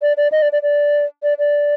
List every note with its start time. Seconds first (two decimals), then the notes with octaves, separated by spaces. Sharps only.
0.02 D5
0.17 D5
0.32 D#5
0.42 D5
0.52 D5
0.62 D5
1.23 D5
1.39 D5